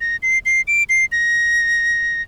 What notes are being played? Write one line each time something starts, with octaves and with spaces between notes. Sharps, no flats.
A#6
C7
C7
D7
C7
A#6